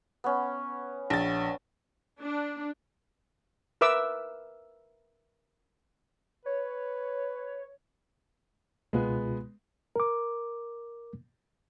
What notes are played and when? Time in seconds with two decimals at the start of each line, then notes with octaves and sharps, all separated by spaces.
0.24 B3 C#4
1.10 A#1 A6
2.21 D4
3.81 A#4 B4 E5 D6 E6
6.46 B4 C#5
8.93 C#2 B2 G#3 B3 F4
9.96 A#4 D6